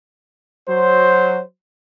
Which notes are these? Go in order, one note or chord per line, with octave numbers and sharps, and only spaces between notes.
F#3 C5